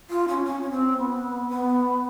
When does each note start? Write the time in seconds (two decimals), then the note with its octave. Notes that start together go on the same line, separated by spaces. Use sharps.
0.10 F4
0.28 C#4
0.45 C#4
0.62 C#4
0.71 C4
0.98 B3
1.50 B3